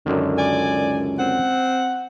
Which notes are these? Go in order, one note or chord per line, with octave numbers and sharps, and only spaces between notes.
C#2 F#2 D3 D#3
D5 G#5
C4 F#5